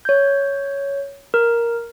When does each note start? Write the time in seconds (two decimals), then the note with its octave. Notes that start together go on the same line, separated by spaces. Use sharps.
0.05 C#5 G6
1.34 A#4